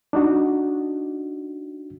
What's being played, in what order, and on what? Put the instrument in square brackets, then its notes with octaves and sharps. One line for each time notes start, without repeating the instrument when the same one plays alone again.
[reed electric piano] D4 D#4 F#4